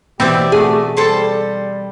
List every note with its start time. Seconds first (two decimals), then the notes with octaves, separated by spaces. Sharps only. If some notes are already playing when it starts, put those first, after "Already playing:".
0.20 B2 E3 C4 G4 D5 E5
0.52 A3 F#4 G#4
0.97 G3 A4 C5 A5